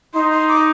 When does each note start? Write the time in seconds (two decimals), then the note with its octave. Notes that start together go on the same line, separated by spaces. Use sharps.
0.14 D#4 C6
0.32 C6
0.48 D6